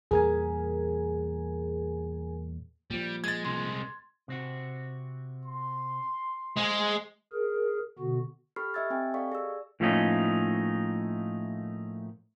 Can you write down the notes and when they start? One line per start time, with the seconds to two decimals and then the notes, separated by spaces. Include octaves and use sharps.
0.11 E2 A#2 G3 G#4 A#4 G#5
2.91 A#2 F3 G3
3.24 G#3 G#6 A6
3.45 C2 G#3 C6
4.28 C3 C4 F#4
5.46 C6
6.57 G#3 C5 F5 G#5
7.32 G#4 A#4
7.99 B2 D3 B3 F#4
8.56 G4 A4 B5 C#6 F6 C7
8.74 G4 D#5 E5 E6 G#6 A6
8.90 C4 G5 G#5
9.14 G4 A4 D5 D#5 F5 C#6
9.32 G#4 D5 E6
9.80 A2 F3 A3 A#3 C#4 D#4